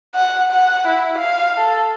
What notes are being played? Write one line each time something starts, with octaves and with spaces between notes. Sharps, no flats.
F#5
F#5
E4
F5
A4